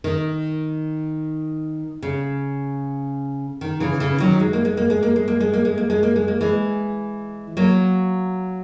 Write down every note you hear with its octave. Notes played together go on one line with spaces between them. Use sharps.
D#3
C#3
D#3
C#3 E3
C#3 E3
D#3 F#3
G#3
A#3
G#3
A#3
G#3
A#3
G#3
A#3
G#3
A#3
G#3
A#3
G#3
A#3
G#3
A#3
E3 G#3
F#3 A#3